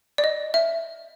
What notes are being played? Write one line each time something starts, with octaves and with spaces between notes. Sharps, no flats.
D5
D#5
E5